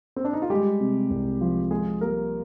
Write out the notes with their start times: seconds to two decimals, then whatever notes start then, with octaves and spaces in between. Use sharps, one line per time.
0.16 C4
0.25 D4
0.33 D#4
0.42 F4
0.50 G3 G#3 G4
0.80 C3
1.10 C2
1.41 F3
1.71 G#3 F4 G#4
2.01 G3 A#3 A#4